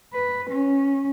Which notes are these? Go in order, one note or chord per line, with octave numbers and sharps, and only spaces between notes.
B4
C#4